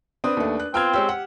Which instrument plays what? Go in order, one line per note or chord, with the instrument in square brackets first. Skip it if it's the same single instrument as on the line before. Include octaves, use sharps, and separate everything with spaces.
[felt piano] C4 [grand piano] D4 B4 D#6
[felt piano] D#2 A3
F#6
[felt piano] B3 F4 [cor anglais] C4 [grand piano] G5 F6 G#6
[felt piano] G#3 C#5 E6 [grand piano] G4
[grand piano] G4 [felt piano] F#5